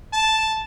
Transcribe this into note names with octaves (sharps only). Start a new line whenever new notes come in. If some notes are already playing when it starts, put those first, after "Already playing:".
A5